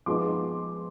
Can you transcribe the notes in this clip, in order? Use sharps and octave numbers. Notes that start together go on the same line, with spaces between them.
F3 G#3 B3 D#4 C6 D6